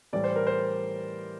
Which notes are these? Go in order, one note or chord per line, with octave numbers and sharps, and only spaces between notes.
A2 E3 G3 D5
C5
A#4
C5